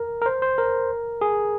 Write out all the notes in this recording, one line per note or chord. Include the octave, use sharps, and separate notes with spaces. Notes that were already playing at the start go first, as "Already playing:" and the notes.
Already playing: A#4
A#4
C5
C5
A#4
G#4